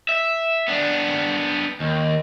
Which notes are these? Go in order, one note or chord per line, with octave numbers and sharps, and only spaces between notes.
E5
B3 D4
D#2